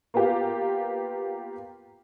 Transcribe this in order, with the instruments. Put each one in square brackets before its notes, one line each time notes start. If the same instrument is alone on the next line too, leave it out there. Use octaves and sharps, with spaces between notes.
[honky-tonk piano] A#3 B3 F4 G4 F5